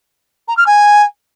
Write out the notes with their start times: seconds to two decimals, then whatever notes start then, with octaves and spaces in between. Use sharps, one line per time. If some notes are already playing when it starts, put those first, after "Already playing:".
0.48 A#5
0.57 F6
0.66 G#5